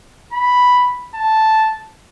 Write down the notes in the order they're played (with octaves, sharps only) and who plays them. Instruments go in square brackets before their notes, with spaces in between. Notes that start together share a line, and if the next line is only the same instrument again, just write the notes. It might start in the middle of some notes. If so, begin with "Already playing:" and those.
[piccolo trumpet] B5
A5